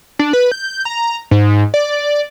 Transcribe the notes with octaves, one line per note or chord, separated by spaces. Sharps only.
D4
B4
G6
A#5
G#2
D5